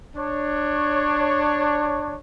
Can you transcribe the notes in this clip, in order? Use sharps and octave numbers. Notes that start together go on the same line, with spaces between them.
D4 C#5